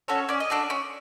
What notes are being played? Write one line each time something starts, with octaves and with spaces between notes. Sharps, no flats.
C#4 F#4 A4 C#5
C#4 D5
D#5
D4 F#4 A4 D5
C#4